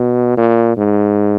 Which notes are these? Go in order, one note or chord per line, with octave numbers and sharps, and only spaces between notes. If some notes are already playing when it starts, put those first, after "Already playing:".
Already playing: B2
A#2
G#2